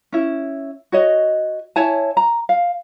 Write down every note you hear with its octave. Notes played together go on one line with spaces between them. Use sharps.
C#4 E4
F#4 C#5 D#5
E4 C#5 G#5 A5
A#5
F5